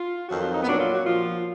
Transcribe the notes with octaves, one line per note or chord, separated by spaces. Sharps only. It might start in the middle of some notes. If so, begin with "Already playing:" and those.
Already playing: F4
F2 D#3 F#3 F#4
F4
D#4
B3
A#2 F#3 D4
F4
F#4
A#2 F3 F4